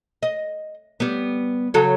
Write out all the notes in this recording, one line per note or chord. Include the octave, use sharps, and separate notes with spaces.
D#5
G3 B3
C#3 F#3 A4